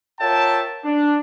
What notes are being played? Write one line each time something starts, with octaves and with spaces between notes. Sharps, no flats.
F4 A#4 C#5 E5 G5 A5
D4